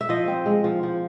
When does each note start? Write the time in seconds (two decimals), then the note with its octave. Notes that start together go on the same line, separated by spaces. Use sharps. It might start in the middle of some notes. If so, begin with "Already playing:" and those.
0.01 E5
0.09 F3 D#5
0.28 C4
0.46 G#3
0.64 F3
0.83 F3